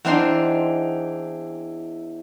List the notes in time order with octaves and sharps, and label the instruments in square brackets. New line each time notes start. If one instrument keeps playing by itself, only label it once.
[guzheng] E2 E3 C4 D4 D#4 C6